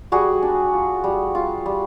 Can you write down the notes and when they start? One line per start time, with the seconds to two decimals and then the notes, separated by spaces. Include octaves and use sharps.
0.12 G3 F#4 G#4
0.43 D4
0.73 F4
1.04 G3
1.35 F4
1.66 G3